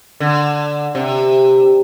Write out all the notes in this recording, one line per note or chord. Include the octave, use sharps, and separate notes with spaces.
D3
C3